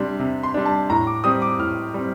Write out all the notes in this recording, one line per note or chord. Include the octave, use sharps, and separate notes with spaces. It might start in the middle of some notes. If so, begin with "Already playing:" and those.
Already playing: C3 G3 D4 C6
C3
C6
G3 D4
A5
A2 A#5
D6
G3 C4 D#6
D6
A2 F6
G3 C4